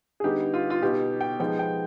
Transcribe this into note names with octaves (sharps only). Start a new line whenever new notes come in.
G#4
D3 G3 B3 D#4 G4
F4
F4
B2 B3 D#4 G4
G5
F3 G#3 B3 D#4 G5
G5